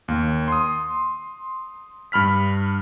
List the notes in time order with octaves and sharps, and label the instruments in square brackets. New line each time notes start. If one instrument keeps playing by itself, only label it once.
[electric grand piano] D#2
C6 D#6
G2 B5 F6 B6